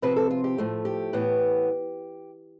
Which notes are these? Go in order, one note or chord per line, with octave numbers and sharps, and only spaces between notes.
C3 F3 C4 B4
A4
F4
G4
A2 F3 A3
G4
A2 E3 B3